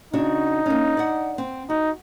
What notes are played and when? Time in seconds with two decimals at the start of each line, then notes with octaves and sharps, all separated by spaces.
0.13 C#3 D4 D#4 F#4
0.66 A#3 C#4
0.97 D5 F#5
1.38 C4
1.70 D#4 F#4